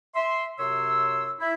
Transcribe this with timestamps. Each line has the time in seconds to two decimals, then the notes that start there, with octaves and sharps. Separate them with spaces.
0.15 E5 C6
0.58 F#2 C3 C#5 C6 E6
1.40 E4